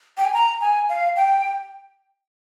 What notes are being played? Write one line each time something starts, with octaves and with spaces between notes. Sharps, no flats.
G5
G#5
A#5
G#5
F5
G5